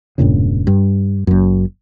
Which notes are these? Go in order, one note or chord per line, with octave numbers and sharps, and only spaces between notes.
E1 G2 A#2 C#3
G2
F#1 F#2